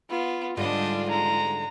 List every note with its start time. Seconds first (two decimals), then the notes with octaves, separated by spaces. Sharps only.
0.10 B3 F4
0.57 G#2 D3 G3 D4 F4 D#5
1.10 G#3 A#5